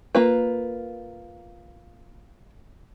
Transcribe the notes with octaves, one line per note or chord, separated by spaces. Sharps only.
A#3 F4 B4